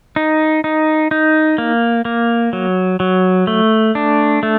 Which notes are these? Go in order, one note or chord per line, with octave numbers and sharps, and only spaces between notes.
D#4
D#4
D#4
A#3
A#3
F#3
F#3
A3
D4
A3